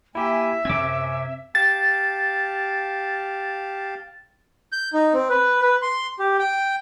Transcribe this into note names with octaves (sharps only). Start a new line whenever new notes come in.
A#3 E4 G4 E5 G#5
F#2 C3 C4 C#4 D6 E6 G#6
G4 F5 A5 A6
G6
D#4
C4
B4
B4
C6
G4
G5